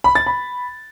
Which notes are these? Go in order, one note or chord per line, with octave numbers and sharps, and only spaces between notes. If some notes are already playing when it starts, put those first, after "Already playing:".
B5
A6
B5